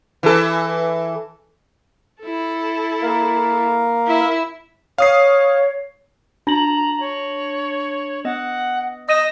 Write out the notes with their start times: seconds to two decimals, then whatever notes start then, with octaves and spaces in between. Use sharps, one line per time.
0.23 E3 A4
2.22 E4 A4
3.03 A#3 A#4 F5
4.07 E4 E5
4.98 C#5 F5 D#6 C7
6.47 D4 A5 A#5 A#6 F#7
7.00 C#5
8.25 B3 D#5 F#5
9.09 D#5 D#6 A#6 D#7 E7